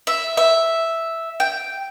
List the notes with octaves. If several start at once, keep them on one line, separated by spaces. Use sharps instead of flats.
E5
E5
G5